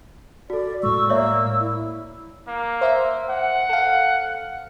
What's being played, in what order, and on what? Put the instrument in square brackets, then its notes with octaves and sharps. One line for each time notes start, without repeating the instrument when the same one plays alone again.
[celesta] F#4 A4 [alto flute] D5
[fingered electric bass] A2 G#3 [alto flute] C#6 [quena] E6
[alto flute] A#3 [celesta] C#5 D5 E5
[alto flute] E4
[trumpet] A#3
[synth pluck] C5 E5
[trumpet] F#5
[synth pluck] A4 F5